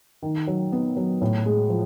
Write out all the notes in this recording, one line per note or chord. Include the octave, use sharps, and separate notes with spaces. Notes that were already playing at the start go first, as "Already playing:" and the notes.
D#3
F#3
B3
F#3
A2
G#3
F3